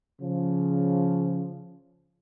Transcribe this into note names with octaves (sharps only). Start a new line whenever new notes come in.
C#3 F3